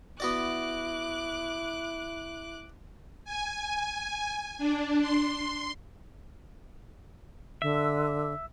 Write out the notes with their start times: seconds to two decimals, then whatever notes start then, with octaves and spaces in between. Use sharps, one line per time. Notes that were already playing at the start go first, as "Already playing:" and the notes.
0.20 B3 E4 F#4 D5 D6 F#6
3.25 G#5
4.58 D4
5.01 C6
7.62 D3 E5